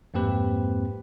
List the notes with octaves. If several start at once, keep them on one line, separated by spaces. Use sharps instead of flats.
F2 G#2 A#3 C4 G4 B4